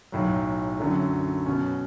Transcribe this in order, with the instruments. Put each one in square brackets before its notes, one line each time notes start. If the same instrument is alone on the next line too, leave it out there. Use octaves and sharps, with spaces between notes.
[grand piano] B1 A2 F#3
F#2 D3 F#3 A3
B2 F#3 C#4